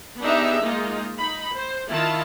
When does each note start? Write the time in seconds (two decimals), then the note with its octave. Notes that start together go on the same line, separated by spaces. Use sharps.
0.20 B3 D4 D#4 G4 G#4 E5
0.63 G#3 A#3 D#4 F4
1.18 D#4 B5
1.54 C5
1.89 D#3 E4 F4 A5